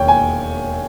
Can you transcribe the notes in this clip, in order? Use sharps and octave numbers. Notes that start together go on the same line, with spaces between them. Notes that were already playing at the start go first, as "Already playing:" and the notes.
Already playing: E1 D#2 C#5 G5
G#5